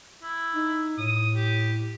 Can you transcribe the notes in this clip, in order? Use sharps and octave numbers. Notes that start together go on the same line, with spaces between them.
E4
D#4
A2 D#6
G4